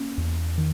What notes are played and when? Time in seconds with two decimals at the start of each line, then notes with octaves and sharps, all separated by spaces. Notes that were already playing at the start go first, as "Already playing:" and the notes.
Already playing: A#3 C#4
0.18 E2
0.58 D#3